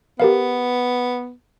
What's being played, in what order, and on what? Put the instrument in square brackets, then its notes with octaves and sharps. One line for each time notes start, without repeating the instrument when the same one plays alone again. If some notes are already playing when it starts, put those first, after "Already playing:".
[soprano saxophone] B3 [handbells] G4 A#4 F5